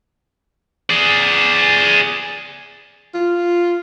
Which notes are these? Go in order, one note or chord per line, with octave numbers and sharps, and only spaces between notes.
G#4 D5
F4